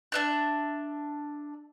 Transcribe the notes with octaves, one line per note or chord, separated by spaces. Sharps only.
D4 E5 F#6